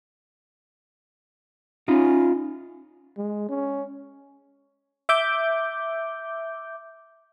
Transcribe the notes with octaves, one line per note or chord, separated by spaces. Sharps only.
C#4 D#4 F4
G#3
C#4
E5 D6 G6